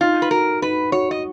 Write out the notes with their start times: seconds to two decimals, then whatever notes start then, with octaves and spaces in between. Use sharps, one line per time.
0.01 D#4 F4
0.22 B4
0.31 F#4 A#4
0.62 D#4 B4
0.92 F#4 C#5
1.11 D#5